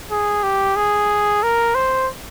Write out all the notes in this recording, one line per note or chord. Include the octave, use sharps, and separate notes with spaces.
G#4
G4
G#4
A#4
C5